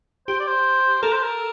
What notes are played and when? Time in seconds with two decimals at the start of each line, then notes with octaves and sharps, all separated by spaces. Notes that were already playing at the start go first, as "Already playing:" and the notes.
0.28 G4 C5
0.40 D5
0.47 C5
1.03 A4 A#4
1.12 C5
1.23 A#4